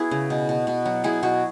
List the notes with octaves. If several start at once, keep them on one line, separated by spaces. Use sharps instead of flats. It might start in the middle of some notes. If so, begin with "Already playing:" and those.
Already playing: B3 E4 F#4 G#4 B4
C#3
B2
B2
B2
F#3
B2 E4 G#4
B2 F#4